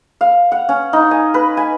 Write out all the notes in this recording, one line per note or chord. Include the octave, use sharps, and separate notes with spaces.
F5
F#5
C#4
D#4
G#5
B4
G#5